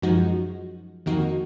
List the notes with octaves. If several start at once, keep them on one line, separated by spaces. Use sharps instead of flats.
F#2 F3 G#3 D#4 F#4
F2 D#3 A#3 D#4 F#4